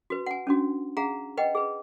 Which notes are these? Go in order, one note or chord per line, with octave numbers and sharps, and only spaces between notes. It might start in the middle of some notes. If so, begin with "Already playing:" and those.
F#4 B4
F#5 G#5
C#4 D4 F#4
G#4 F5 F#5 A#5
B4 D#5 F#5 G5
G#4 B4